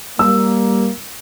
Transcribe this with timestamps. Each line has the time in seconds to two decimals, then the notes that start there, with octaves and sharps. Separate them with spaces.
0.19 G3 A#3 E6